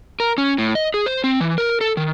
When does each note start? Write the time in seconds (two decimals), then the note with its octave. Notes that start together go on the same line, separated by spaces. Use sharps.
0.20 A#4
0.38 C#4
0.58 A2
0.75 D#5
0.94 G#4
1.06 C5
1.24 C4
1.40 E3
1.58 A#4
1.81 A4
1.97 D#3